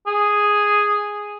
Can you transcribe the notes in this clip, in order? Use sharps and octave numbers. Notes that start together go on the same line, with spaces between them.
G#4